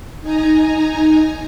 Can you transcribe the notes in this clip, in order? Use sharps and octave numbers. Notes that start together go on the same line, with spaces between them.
D#4 G#5 A#5